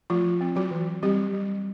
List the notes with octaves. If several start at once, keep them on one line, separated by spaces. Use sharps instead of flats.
F3 A3 F4
C4
F#3 F#4
E3
G3 C4 G4
G3